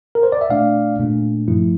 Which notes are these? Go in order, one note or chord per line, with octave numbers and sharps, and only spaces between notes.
A#4
C5
D5
E5
A#2 A3 D4 D5 F5
A#2 A3 D4
G2 F3 A3 E4